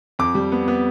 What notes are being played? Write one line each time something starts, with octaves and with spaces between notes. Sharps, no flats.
F2 D6
G3
B3
B3